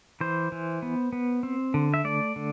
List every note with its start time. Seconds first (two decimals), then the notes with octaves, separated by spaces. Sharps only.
0.21 E3 C5
0.52 E3
0.82 B3
1.13 B3
1.43 C4
1.74 D3
1.94 E5
2.04 A3 D5
2.36 D3